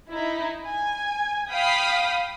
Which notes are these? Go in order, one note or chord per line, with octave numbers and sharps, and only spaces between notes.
D#4 E4
G#5
F5 G5 B5 D#6 B6